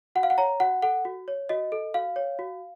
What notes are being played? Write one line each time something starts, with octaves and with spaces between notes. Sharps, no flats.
F#4 F#5
F5
F#5
C#5 A#5
F#4 F#5
A4 F#5
F#4
C#5
F#4 D#5
A4
F#4 F5
C#5
F#4